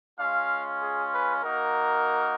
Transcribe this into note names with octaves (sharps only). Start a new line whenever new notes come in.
G#3 C#4 F4 F5
G#4
B4
A#3 D#4 F#4 A#4